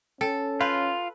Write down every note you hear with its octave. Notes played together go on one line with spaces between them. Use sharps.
C#4 A4 G5
F4 B4 F5 B5 G6